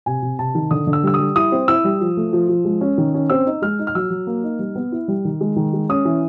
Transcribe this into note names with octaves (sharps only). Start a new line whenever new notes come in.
C3 G#5
C3
C3 A5
D#3
D3 D#6
D3
E6
G3 E6
D#6
G3
E4 D#6
C4
E4 E6
G3
F3
A3
F3
F3
G#3
C#4
D#3
C#4
C4 E6
D#4
G#3 F6
D#4
F6
F#3 E6
F#3
A#3
D#4
G3
B3
E4
G3
D#3
G#3
D#3
G#3
C#4 D#6
E3